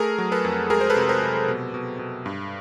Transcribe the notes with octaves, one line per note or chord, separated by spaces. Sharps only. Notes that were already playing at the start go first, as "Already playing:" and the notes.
Already playing: A3 G#4 A#4
F#3
A4 B4
F2
G#3 G#4 A#4
C5
A4 B4
C3
A#4 C5
C3
B2
B2
B2
G2